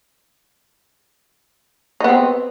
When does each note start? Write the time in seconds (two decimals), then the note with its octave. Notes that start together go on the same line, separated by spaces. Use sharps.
2.00 D#4
2.04 B3
2.08 C4